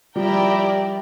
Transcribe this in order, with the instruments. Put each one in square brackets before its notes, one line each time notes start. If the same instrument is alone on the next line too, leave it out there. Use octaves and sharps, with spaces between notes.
[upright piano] F3 G3 [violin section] E4 G4 A#4 D5 G5